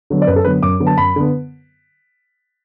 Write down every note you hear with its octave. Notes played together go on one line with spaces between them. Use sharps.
D3 F#3 B3
D5
F#2 B4
A4
D3 F#3 B3 B4
F#2 D6
D3 F#3 B3
A5
F#2 B5
D3 B3